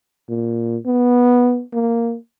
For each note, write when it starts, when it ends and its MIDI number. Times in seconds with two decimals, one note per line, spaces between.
0.29 0.77 46
0.86 1.62 59
1.73 2.16 58